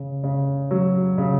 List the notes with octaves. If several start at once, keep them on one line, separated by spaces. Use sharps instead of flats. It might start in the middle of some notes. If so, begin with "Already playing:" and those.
Already playing: C#3
C#3
F#3
C#3